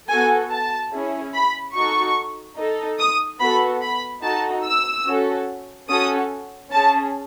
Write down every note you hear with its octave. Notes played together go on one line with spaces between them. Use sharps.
B3 F#4 A4 G#5
A5
C#4 E4 G#4
B5
D#4 F#4 A4 C#6
D#4 A4
D#6
B3 F#4 A4 B5
B5
D#4 F#4 A4 A5
E6
C#4 F#4 A4
C#4 F#4 A4 D#6
C#4 G#4 A5